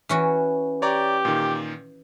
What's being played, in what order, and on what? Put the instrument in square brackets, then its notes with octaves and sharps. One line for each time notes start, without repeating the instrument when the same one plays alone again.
[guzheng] E3 C#4 F#4
[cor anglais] G4 [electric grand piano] C#5 D5 A#5
[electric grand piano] A#2 D#3